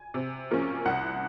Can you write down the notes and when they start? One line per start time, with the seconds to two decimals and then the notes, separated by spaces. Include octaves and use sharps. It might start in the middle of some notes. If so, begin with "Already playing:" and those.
Already playing: G#5
0.14 C3
0.51 F3 A#3 C#4
0.86 C2 F#5